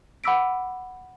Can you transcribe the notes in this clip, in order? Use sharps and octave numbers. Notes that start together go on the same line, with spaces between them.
F#5 B5 D6 E6 B6 D7